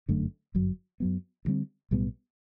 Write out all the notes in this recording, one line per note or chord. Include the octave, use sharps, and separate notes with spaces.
G1 F#2 D3 A3
G1 F#2 F#3
F#2 F#3 B3
D2 D3 G3 C4
B1 A2 G3 B3